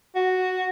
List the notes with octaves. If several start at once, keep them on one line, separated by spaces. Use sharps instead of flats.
F#4